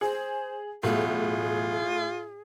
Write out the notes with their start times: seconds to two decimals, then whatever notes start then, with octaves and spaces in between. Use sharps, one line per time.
0.01 G#4 C5
0.83 B1 E2 A2 F#3 F4 G#4